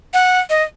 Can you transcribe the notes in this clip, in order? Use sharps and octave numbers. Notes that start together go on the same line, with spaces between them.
F#5
D#5